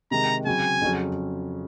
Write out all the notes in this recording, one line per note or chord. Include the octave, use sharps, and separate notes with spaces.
C3 D#3 G#3 A#5
C#3 F#3 C4 G#5
F2 C#3 F#3 C#4